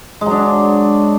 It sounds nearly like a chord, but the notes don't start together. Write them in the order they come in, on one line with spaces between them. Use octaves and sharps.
G#3 F#3 D4